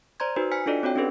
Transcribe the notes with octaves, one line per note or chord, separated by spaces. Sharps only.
C5 D5 A#5 C6 G#6
D#4 F#4 B4 C5
C5 G#5 F6 B6 C#7
D4 F4 A4 D5 D#5
C4 F#4 C#5 G5
C#4 D4 G4 A4 B4